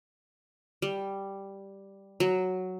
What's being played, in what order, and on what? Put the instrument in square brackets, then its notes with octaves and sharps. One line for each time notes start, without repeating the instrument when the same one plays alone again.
[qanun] G3
F#3